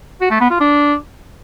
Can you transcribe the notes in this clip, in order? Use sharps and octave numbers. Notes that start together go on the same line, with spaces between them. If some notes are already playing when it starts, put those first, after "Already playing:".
F#4
A3
B3
F4
D4